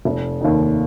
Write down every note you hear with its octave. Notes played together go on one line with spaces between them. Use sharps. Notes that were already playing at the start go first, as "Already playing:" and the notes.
F1
D#2 D#3